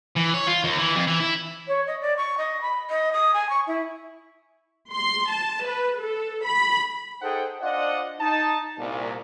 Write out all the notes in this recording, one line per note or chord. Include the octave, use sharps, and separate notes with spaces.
E3
C#5
F4
D#2
E3
F2
E3
E4
C#5
D#5
D5
C#6
D#5
B5
D#5
D#6
G#5
C#6
E4
C6
A5
B4
A4
B5
D#4 G#4 A4 C5 F#5 G5
D4 F4 C5 D5 D#5 F#5
D#4 A5
C2 A#2